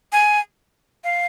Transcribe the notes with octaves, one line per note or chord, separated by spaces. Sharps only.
G#5
F5